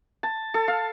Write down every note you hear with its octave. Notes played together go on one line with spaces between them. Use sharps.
A5
A4
F5